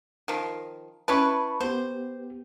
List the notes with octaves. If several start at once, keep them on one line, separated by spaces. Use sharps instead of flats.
D#3 F3
C#4 E4 B4 A5 B5 C#6
B3 G4 C5